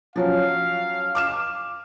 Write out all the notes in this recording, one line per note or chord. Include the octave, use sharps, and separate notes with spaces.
F3 F#3 C#4 F5
D6 F6 E7